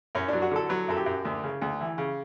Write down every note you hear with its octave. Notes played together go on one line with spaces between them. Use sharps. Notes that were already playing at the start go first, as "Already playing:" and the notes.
F#2 C#4
F#3 D4
F#4
D3 A4
F#3 B4
F#2 A4
G4
F#2
D2
C#3
D2
E3
C#3